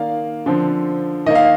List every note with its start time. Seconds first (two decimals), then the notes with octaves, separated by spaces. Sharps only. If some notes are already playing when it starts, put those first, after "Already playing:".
Already playing: D#3 A#3 D5 F5
0.46 D3 F3 C4
1.26 D#3 A#3 D#5
1.35 F5